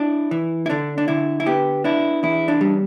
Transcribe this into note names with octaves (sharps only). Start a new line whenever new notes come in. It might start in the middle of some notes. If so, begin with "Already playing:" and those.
Already playing: D4 E4
E3
E4
D3 D4
D4
D3 E4
E4
B3 G4
D4 E4
E2 E4
D4
G3